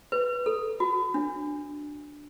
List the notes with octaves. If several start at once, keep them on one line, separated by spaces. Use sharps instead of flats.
B4
A4
F#4
D4